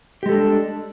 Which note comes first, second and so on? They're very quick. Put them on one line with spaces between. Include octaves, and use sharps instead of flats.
G4 G#3 A4 D4